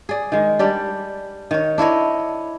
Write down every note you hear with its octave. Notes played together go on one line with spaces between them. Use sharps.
G#4 D5
D#3 G#3
G3 D4 D5
D#3 C#5
D4 E4 C#5 D#5